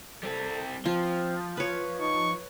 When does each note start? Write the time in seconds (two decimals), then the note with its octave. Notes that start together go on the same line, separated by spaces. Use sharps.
0.23 G3 C4 A4
0.85 F3 C4 F4
1.57 F4 B4 C#5
2.00 D#4 C#6